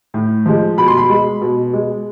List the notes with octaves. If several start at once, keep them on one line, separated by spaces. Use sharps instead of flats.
A2
F3 G#3
B2 B5
C6
B5
G#3
B2
G#3